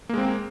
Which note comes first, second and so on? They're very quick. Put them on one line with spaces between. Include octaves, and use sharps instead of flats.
A#3 G#3 C4